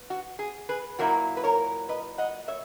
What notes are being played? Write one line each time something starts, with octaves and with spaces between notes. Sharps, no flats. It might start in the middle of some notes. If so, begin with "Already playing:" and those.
Already playing: B3
F#4
G#4
G#4 B4
A#2 F#3 A#3 E4 F#4 A#4
B4
A#4 C#5
B4 D#5
D#5 F#5
C#5 E5